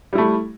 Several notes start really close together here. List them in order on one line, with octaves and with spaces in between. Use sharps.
G3 E4 A3